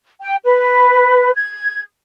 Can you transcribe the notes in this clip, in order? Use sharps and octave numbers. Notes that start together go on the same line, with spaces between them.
G5
B4
G#6